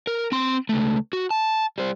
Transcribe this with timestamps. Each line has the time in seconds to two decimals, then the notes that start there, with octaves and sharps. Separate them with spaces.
0.07 A#4
0.32 C4 C6
0.69 C#2 A3
1.13 F#4
1.31 A5
1.78 G3 C5